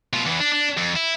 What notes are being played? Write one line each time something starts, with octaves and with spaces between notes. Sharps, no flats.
B2 F4
E2 E3
D4
D4
F2
E4